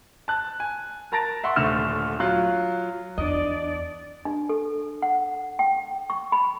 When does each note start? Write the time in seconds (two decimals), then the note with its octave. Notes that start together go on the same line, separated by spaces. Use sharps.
0.28 A5 F#6
0.60 G#5
1.12 A#4 A5 A#5 A6 A#6 D7
1.44 E5 F#5 C6 C#6
1.56 D#1 D3 A3 F6 E7
2.20 F#3 F4 F#6
3.18 E2 D4 D5 D#5
4.25 D4
4.49 A4
5.02 F#5
5.59 G5
6.10 C#6
6.32 B5